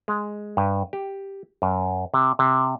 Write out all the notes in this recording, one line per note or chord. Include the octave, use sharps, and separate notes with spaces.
G#3
G2
G4
F#2
C3
C3